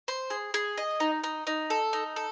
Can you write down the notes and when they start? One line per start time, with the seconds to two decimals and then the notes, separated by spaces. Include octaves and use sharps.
0.08 C5
0.30 G#4
0.54 G#4
0.78 D#5
1.00 D#4
1.24 D#4
1.47 D#4
1.70 A4
1.93 D#4
2.16 A4